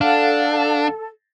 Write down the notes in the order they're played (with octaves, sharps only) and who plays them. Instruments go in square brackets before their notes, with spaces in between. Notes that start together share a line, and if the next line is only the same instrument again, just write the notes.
[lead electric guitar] D4 [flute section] A4 [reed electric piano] F5 F#5